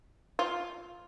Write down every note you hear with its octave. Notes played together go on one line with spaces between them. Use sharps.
F4